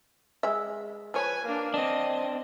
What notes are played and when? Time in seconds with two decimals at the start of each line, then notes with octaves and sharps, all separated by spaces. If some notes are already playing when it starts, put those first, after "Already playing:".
0.43 G#3 E5
1.14 F3 B4 C#5 G#5
1.45 A#3 D4
1.74 C4 D4 D#5